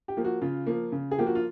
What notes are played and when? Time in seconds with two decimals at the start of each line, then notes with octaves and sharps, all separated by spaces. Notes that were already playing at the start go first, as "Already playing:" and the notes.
0.08 G4
0.17 F3 A#3
0.25 F#4
0.42 C#3 F4
0.67 F3 A#3
0.92 C#3
1.11 G#4
1.18 F3 A#3 G4
1.27 F#4
1.35 F4